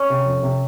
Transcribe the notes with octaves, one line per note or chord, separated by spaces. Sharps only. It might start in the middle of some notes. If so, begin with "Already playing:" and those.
Already playing: C#4
C3
F2
C3